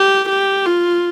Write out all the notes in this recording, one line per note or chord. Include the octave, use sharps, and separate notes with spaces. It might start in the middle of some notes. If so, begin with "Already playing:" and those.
Already playing: G4
G4
F4